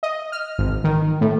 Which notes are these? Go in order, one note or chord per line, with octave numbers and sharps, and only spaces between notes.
D#5
F6
G#1
D#3
A2